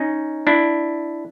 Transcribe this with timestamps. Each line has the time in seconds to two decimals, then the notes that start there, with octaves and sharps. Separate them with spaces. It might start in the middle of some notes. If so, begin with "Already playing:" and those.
Already playing: C#4 D#4
0.47 D4 E4